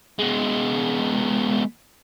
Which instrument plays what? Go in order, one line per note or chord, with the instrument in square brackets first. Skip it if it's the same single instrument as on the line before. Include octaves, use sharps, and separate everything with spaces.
[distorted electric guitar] G#3 B3